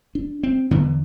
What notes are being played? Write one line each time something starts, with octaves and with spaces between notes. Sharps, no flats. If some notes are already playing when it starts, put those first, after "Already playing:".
D4
C4
E2 D3 B3